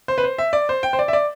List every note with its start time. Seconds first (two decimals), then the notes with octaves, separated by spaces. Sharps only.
0.08 C5
0.18 B4
0.24 C5
0.38 E5
0.53 D5
0.69 C5
0.83 G5
0.93 C5
0.99 D5
1.08 E5
1.13 D5